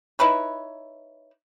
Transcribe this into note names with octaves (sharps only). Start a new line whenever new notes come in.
D#4 E4 B4 C#5